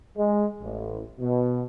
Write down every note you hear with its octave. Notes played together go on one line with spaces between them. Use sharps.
G#3
A1
B2